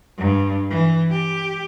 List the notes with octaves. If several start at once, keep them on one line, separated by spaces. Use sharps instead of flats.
G2
E3
G4